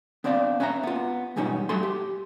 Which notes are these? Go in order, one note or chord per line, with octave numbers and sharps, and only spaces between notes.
B3 C4 D4 D5 F5
C#4 B4 C#5 E5 A#5
B3 F4
E2 G#2 B2 G3 C#4 D#4
G2 F#3 A3 A4 C6
G4